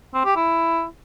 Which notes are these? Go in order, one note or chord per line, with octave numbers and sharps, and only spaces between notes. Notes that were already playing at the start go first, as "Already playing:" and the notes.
C4
G4
E4